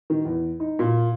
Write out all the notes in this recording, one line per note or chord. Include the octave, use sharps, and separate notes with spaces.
D#3
E2
D#4
A#2